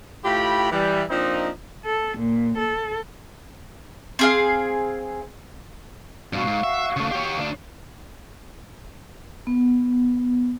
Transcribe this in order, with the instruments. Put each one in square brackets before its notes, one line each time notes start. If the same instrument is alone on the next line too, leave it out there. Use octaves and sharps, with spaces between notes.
[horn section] A2 F4 G4 G5 B5
E3 G3
F3 A#3 C4 D4 D#4
[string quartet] A4
A#2
A4
[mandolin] C4 G#4 F5
[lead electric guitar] G2 B2 [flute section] F#4 F5 C#6
[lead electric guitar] G#2
E5
C#3 A3
G4 C#5
D2 D4
[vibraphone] B3